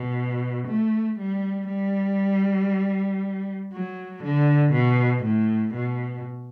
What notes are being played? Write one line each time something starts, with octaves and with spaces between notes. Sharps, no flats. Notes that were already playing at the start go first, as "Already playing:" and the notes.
Already playing: B2
A3
G3
G3
F#3
D3
B2
A2
B2